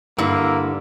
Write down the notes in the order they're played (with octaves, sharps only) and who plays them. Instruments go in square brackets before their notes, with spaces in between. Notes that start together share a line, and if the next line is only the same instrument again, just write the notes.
[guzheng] G2 [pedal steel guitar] D3 E4 [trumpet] A#3